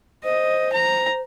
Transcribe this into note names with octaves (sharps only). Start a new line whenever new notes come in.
C5 D#5
A#5